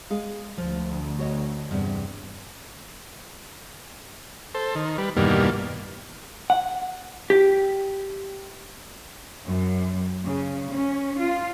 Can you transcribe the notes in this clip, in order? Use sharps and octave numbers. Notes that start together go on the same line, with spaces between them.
G#3 G#4 F5
D2 F3
F#4 C#5 D#5
E2 G2 C3
A4 C5
D#3
G3 B4
E2 G2 B2 D#3 G3 A#3
F#5
G4
F#2
C#3
C#4
F4